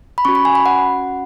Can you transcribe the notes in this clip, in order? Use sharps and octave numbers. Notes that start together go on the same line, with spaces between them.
B5
C#4 F#4 C#6
B5
G#5
B5
F#5